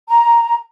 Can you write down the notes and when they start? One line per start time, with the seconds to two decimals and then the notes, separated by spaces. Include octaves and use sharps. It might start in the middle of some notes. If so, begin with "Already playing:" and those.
0.09 A#5